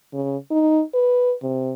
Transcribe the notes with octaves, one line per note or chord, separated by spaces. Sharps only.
C#3
D#4
B4
C3